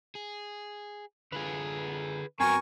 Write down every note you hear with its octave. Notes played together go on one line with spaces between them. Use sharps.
G#4
D3 F4 G#4 B4
F#2 B3 C4 F#4 A#4 G#5 C#6